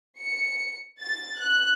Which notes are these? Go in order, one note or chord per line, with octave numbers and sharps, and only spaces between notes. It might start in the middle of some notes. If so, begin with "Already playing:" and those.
C#7
A6
F#6